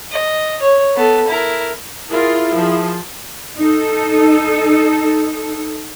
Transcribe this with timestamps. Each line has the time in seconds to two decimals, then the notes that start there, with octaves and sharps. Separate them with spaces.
0.12 D#5
0.62 C#5
0.96 B3 A4
1.28 E4 A#4
2.09 E4 F4 G#4 A#4
2.55 F3 G#4
3.58 D#4 A4